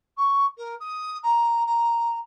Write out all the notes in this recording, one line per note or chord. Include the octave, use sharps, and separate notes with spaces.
C#6
A#4
D#6
A#5
A#5